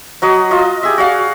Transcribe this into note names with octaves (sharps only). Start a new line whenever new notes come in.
F#3 F#4 D#5
F4 D#5
G4 G#4 E5
F#4 D5 F5